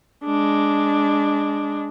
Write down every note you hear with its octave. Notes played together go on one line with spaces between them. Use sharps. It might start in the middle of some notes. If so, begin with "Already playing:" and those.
G#3 D4